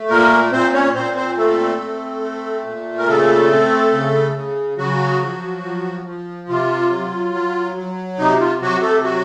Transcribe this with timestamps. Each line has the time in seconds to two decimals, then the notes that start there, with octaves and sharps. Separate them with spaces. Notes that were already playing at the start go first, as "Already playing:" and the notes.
Already playing: A3
0.09 A#2 A#3 A#4
0.52 A#2 C4 C5
0.73 C#4 C#5
0.95 A#2 C4 C5
1.16 C4 C5
1.37 A3 C4 A4
1.80 C4
2.23 A3
2.65 A#2
2.98 A#4
3.08 C#3 A3 A4
3.51 C4
3.92 C#3
4.35 C#3
4.78 C#3 F#3 F#4
5.21 F3
5.63 F3
6.05 F3
6.49 C3 F4
6.90 F#3
7.34 F#3
7.76 F#3
8.19 C3 D#4
8.40 F4
8.61 C3 F#3 F#4
8.82 A3 A4
9.03 F#3 F#4